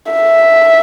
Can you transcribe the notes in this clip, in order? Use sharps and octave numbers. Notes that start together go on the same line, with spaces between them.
E5